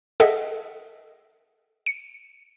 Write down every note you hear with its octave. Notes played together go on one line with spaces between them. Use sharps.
G#4 A4 D#5 E5 F#5
C#7